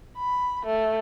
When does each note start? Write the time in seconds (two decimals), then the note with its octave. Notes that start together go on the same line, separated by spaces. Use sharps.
0.18 B5
0.65 A3